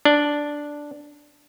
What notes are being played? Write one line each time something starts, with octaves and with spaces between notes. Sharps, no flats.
D4